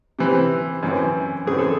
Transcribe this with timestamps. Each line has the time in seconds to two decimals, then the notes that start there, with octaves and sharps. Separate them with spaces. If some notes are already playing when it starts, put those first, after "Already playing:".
0.19 C3 E3 C4
0.83 F#2 E3 C4
1.47 F#2 C#3 E3 C4 G#4
1.58 A4